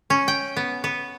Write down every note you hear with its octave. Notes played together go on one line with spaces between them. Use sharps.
C#4
G5
B3
B3